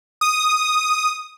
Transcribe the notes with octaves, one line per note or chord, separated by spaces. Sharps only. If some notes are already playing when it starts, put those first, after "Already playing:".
D#6